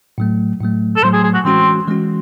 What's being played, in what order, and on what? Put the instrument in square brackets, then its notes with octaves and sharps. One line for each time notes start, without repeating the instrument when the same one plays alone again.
[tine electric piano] A2 F#3 A3
A2 F#3 A3
[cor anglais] A4
[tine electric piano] A2 F#3 A3 [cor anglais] C5
[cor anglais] G#4
G#4
F#4
[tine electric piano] E3 G#3 C#4 F#4 [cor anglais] C4
[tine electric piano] E3 G#3 C#4 F#4